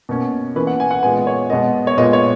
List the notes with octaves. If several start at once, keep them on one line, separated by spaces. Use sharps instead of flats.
B2 A#3 C#4
E3 A#3 C#4 B4
F#5
G#5
F#5
A#2 G#3 B3 G#5
C#5
B2 G#3 B3 D#5
C#5
A#2 G#3 B3 D#5
C#5